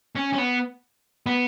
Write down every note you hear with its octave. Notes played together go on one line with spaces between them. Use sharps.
C#4
C#4
B3
B3